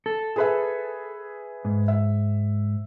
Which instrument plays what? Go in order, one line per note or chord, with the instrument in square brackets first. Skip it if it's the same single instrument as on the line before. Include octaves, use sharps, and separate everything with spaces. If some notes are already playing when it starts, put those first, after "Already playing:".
[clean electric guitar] A4
[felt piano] G#4 B4 E5
[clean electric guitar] G#2
[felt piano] E5